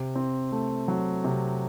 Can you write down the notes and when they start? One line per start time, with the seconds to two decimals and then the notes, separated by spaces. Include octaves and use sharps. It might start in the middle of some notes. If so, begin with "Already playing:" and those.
Already playing: C3
0.16 C4
0.52 A3
0.88 F#3
1.24 C3